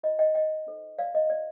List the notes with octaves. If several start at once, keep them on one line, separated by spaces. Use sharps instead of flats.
F4 C5 D#5
D#5 G5
D#5 G5
D#4 A4 C5
D5 F5
D#5
D#5
F4 C5 D5